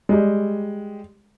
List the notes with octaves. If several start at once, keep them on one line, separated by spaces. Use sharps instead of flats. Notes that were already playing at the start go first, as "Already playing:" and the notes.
G3 G#3